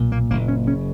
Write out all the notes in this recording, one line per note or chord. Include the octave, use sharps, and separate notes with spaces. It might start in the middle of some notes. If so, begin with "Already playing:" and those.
Already playing: B1 A#2
A#3
F#1 A#3
C#4
C#3 C#4